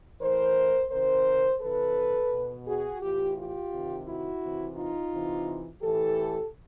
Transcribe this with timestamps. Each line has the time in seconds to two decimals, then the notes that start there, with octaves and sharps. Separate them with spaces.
0.21 A2 E3 A#4 C5
0.91 C3 D#3 A#4 C5
1.61 C3 E3 A4 B4
2.32 B2
2.66 F#4 G#4
3.02 A2 E3 F4 G4
3.37 F4 G4
3.72 C3 D#3
4.07 E4 F#4
4.42 C3 E3
4.77 D#4 F4
5.12 C3 E3
5.82 A2 E3 G4 A4